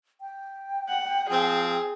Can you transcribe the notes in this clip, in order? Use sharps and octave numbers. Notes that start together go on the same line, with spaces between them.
G5
F#5
F3 C4 G#4